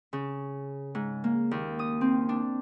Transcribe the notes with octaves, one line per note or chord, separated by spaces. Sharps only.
C#3
G#2
A#3
D#2
D#6
C4
D4